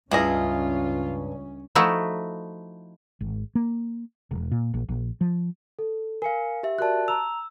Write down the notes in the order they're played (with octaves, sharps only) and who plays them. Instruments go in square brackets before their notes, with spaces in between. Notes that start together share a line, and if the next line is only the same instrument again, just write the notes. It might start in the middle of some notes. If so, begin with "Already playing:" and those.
[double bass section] C#2 C#4 [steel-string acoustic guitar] G2 [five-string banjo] E4 G#4 D#5 [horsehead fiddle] F4
[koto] F3 A3 D#4 E4 F#4
[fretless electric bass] G#1
A#3
E1
A#2
A#1
A#1
F3
[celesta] A4
[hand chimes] A#4 F5 [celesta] G#5 C#7
[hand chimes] G4 E5
[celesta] F#4 A#4 D5 [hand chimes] A5 F#6
[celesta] A#5 F7 [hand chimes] E6